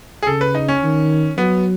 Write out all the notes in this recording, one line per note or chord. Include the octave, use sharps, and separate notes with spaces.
G#4
C#3 A4
B4
D#4
C#4
D#3
F#3 B3